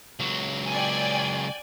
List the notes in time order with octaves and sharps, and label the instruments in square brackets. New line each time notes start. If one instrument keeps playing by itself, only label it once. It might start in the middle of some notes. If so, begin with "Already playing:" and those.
[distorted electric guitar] C#2 F#3
[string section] D5 G5 G#5